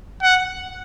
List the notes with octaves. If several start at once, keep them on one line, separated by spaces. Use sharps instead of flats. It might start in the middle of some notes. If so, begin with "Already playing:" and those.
F#5